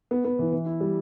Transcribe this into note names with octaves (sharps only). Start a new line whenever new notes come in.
B3
B3
E3
E3
E4
G3